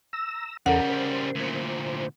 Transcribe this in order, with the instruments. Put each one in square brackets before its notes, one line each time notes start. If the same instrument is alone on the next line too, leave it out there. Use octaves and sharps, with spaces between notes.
[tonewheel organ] A#5 E6
[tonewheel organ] E2 A4 A#5 [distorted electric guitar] C#3 G3 [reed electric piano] C#4 A#4 [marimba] F#5
[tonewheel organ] C5
[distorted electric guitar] D2 A#2